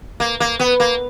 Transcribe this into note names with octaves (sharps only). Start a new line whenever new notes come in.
A#3
A#3
B3
A#3